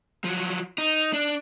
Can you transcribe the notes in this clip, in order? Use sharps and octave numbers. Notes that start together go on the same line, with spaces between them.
F3 F#3
D#4
D4